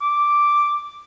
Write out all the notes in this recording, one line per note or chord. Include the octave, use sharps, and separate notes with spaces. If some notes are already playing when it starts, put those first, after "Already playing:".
D6